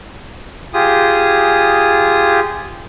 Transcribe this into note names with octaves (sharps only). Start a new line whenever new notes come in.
F4 G4 G#4 D#6